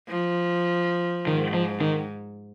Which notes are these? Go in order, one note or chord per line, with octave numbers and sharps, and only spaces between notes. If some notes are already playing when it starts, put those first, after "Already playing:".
F3
G#2 D#3
F3
D#3